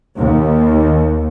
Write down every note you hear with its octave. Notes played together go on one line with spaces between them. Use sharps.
D#2